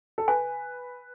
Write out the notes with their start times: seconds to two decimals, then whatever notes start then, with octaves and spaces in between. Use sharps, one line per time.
0.18 A4
0.28 B4 G#5